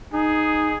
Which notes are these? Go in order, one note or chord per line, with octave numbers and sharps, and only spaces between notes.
D#4 G#4